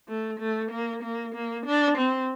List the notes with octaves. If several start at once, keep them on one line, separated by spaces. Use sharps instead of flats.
A3
A3
A#3
A#3
A#3
D4
C4